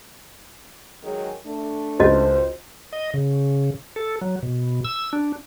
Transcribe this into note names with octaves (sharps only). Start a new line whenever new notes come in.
D#3 F#3 G#3
A3 D4
C#2 F#4 C5 D#5
D#5
C#3
A4
F#3
B2
E6
D4